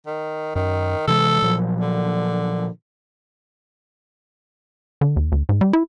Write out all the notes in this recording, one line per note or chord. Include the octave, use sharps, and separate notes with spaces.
D#3
F#2 D#3
C3 E3 G#3 A4
A#2 F3 F#3
D3
D3
D#2
D2
G#2
G3
E4